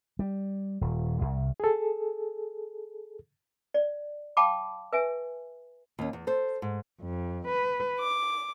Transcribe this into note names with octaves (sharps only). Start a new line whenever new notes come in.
G3
D#1
C2
G#4 A4
D5
F5 G5 A5 B5 D6
B4 E5 G#5
D#2 C#4
E2
A4 C5
G#2
F2
B4
D6